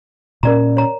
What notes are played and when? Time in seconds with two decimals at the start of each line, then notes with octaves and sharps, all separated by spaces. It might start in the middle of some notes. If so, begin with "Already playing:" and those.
0.43 A#2 C#4 A#4 D5 A#5
0.77 C#5 A#5